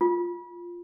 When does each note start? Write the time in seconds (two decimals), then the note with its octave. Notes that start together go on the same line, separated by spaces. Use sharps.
0.01 F4